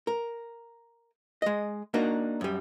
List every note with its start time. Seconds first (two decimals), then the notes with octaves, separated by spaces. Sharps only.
0.07 A#4
1.42 G#3 D#5
1.94 A#3 D4 D#4 F#4 A#4
2.41 F#2 G3